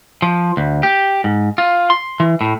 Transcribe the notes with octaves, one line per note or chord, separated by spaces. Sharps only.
F3
D2
G4
G#2
F4
C6
E3
A2